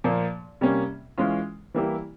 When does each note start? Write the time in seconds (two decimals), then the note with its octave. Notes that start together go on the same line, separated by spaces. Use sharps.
0.04 A#2 F3 A#3
0.61 C3 G3 A#3 C#4
1.18 E3 G#3 C#4 F4
1.74 E3 G3 A#3 E4 G4